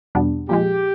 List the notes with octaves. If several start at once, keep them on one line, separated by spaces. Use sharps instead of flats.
E2 B2 G3 B3 D4
A#2 F3 G#3 G4